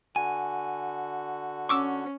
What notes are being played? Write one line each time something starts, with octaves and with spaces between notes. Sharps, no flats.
D3 F#4 G#5
C#4 C#6 D6 E6